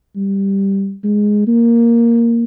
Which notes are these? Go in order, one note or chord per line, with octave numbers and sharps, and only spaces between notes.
G3
G#3
A#3